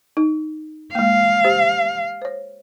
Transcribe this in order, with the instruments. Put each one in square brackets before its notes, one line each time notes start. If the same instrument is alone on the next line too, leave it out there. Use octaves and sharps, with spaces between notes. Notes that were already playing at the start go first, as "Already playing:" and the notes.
[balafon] D#4
[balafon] G#3 A#3 [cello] F5
[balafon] G4 C5
C5 C#5